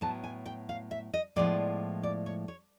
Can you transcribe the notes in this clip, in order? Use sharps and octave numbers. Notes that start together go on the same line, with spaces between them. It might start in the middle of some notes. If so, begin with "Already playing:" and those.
A2 F#3 B3 A5
G#5
G5
F5
E5
D#5
A2 F3 G#3 B3 D5
D5
C#5
C#5